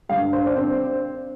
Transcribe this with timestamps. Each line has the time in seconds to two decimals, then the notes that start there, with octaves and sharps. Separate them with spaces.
0.09 G2 D3 G3 F5
0.33 C5
0.46 D4
0.56 C4